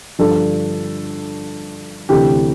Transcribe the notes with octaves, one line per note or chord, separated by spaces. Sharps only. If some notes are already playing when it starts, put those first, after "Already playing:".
G2 D3 F3 A4
D2 C3 E3 G4